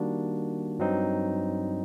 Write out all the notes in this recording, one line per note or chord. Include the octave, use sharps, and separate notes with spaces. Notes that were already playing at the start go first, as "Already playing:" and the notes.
Already playing: D#3 G3 A#3 D4 F#4
G2 F#3 C4 D#4